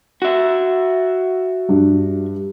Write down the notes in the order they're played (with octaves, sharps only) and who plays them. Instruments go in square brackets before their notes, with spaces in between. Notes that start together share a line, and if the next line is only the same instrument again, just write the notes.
[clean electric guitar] F#4 E5
[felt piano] G2